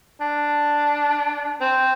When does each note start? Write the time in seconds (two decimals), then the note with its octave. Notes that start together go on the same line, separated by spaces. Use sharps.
0.20 D4
1.60 C4